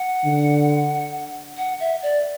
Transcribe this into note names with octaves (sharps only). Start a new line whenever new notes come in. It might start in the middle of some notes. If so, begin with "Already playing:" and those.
Already playing: F#5
D3
F#5
E5
D5